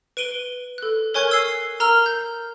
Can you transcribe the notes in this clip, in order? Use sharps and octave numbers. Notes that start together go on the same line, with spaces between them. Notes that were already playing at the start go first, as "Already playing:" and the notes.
B4 D7 D#7 G7
A4 F#6
A#4 C#5 G#5 C#6 F#6 G#6
E6 C7
A#4 A#5 E6 F6 F7
G6